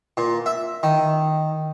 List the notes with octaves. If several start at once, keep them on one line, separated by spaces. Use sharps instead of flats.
A#2
E5
D#3